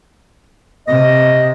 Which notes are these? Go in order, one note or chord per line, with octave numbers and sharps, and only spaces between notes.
C3 D#5